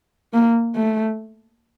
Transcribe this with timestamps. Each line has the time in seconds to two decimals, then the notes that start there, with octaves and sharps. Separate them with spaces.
0.33 A#3
0.75 A3